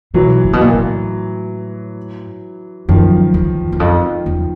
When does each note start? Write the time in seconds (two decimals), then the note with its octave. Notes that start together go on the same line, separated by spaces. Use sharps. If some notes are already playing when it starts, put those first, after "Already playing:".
0.14 B2 E3 F#3
0.45 A#2
0.53 B2
0.61 A#2
0.75 A2
2.89 F#2 D#3 F3
3.34 E2
3.72 E2
3.80 F2
4.26 E2